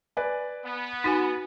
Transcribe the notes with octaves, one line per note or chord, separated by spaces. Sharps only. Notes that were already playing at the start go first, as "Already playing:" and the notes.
B4 D5 G#5
B3
D#4 F#4 G#5 A6